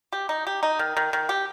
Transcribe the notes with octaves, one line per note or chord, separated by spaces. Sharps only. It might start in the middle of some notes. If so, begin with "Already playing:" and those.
G4
D#4
G4
D#4
D#3
D#3
D#3
G4